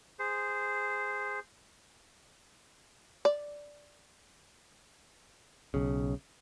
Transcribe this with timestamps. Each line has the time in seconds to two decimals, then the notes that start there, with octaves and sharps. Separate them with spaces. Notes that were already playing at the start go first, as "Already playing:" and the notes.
0.19 G#4 C5
3.25 D5
5.74 B1 C#3